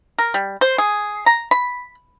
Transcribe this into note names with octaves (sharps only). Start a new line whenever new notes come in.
A#4
G3
C5
G#4
A#5
B5